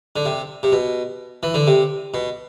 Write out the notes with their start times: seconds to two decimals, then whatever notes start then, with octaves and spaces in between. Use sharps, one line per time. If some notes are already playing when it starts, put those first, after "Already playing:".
0.16 D3
0.25 C3
0.63 C3
0.72 B2
1.43 E3
1.54 D3
1.67 C3
2.14 B2